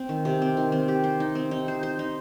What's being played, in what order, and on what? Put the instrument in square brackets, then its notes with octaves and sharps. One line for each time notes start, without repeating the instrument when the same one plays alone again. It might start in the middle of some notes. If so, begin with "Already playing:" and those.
Already playing: [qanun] C4
D#3
C3
C4
D#3
C4
G4
C5
D#4
C4
D#4
C5
C5
D#4